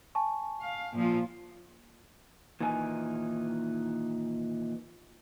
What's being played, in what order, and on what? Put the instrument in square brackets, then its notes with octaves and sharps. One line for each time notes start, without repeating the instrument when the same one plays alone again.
[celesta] G#5 A5 C#6
[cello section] F5
A#2 F3 F4
[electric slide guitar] A#2 D#3 E3 D#4 G#5